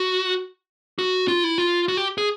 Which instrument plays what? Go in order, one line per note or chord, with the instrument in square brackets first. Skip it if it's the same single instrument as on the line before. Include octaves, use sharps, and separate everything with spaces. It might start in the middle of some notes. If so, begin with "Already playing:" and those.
Already playing: [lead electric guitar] F#4
F#4
F4
E4
F4
F#4
G4
G#4